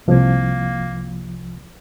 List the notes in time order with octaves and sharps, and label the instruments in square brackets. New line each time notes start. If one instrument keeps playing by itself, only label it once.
[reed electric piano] C2 F3 [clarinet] A#3